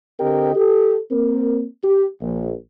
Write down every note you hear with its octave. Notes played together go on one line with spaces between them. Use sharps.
D3 C4 G4 A#4 D#5 G5
G4 A4
A#3 C4 A#4
G4
A#1